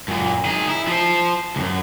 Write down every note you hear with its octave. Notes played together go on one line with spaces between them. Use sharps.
F#2 A#2
D#3 G#4
E4
F3 C5
C#2 F#2